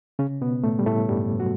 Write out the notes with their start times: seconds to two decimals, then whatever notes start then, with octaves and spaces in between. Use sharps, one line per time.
0.19 C#3 C#4
0.41 B2 B3
0.63 A2 A3
0.79 G3
0.86 A2 A3
1.09 G2 G3
1.39 F#3 F#4